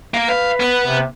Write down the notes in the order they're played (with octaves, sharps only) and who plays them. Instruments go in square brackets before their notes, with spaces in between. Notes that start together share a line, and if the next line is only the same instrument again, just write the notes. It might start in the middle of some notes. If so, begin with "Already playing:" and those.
[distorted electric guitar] A#3
[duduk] B4 [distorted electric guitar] F5
[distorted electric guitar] B3
[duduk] C3